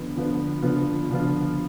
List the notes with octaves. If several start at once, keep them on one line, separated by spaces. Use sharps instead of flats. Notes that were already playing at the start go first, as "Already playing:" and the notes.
Already playing: D3 F3 B3
D3 F3 B3
D3 F3 B3 F4
D3 F3 B3 F4